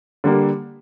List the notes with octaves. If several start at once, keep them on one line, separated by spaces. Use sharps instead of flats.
D3 G3 A#3